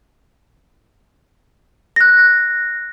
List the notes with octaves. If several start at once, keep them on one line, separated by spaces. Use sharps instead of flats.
F#6 A#6